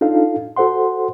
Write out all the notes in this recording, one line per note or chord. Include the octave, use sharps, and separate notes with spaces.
D4 D#4 F4 A4 F5
F#4 A4 C5 F#5 C6